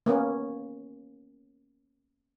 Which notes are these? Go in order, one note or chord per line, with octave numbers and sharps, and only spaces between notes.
A#3 B3 C#4